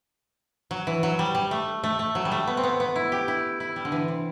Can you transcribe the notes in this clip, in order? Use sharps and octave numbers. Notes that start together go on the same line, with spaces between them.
F#3
E3
F#3
G3
G3
A3
A3
A3
F#3
G3
A3
B3
C4
B3
B3
E4
G4
E4
E4
G3
D3
E3
C3